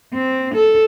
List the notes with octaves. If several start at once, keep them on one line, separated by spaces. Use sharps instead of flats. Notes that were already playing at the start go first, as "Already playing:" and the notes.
C4
A4